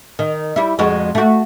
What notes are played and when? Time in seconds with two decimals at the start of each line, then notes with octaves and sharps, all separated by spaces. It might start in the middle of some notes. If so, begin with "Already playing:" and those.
0.19 D#3
0.56 G3 E4
0.79 F2 G#3 F#4
1.15 A3 F#4